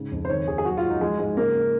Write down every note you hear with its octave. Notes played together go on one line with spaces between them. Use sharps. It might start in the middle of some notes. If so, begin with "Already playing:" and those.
Already playing: G#2 C#3
F2
C5
D#3 C#5
D#2 G#4
G#4
F#3 F#4
F4
G#2
D#4
F3 G#3
G#2 G#3
C#3 A#3